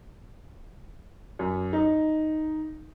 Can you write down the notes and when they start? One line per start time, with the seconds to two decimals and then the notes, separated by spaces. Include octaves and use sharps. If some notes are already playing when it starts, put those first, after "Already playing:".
1.39 F#2
1.73 D#4